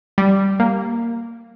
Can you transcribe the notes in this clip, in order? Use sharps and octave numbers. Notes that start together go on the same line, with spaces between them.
G3
A#3